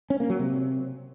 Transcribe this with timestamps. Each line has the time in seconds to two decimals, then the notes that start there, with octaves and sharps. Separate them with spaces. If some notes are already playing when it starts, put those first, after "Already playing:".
0.10 C#4
0.20 A#3
0.30 F#3
0.39 C3